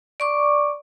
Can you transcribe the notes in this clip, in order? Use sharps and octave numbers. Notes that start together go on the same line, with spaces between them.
D5 C#6 D6